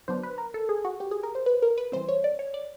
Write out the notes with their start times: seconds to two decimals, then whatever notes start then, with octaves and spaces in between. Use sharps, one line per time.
0.08 D3 F#3 B3 D4 C5
0.23 B4
0.38 A#4
0.54 A4
0.69 G#4
0.85 F#4
1.00 G4
1.11 G#4
1.23 A#4
1.35 C5
1.46 B4
1.62 A#4
1.78 B4
1.92 E3 G3 C4 C5
2.09 C#5
2.24 D5
2.39 C#5
2.54 D5